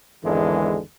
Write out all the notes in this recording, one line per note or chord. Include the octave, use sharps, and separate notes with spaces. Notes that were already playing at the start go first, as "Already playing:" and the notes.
G#1 E2 D3 E3 G#3